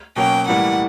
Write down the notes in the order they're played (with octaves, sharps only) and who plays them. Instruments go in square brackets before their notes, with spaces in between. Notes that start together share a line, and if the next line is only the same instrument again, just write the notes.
[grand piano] B2 F#3 A#3 C#4 [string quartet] G5
[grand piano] A2 E3 G3 A#3 [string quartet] F#5